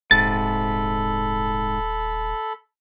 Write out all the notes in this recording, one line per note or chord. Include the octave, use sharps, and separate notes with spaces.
D#1 G#2 C3 A4 B5 A6